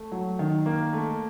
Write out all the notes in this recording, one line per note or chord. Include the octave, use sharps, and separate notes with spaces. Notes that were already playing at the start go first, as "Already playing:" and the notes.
Already playing: A3
F#3
D#3
A#3
A3